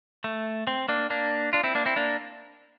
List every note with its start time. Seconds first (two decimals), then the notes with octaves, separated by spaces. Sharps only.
0.24 A3
0.67 C4
0.88 A#3 D4
1.10 A#3 D4
1.53 D4 F4
1.63 C4 E4
1.75 A#3 D4
1.86 C4 E4
1.96 A#3 D4